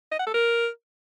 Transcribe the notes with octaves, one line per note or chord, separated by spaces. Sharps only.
D#5
F#5
A4
A#4